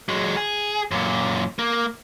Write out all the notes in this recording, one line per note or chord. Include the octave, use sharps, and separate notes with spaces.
F#3 G#3
G#4
F#2 A#2
A#3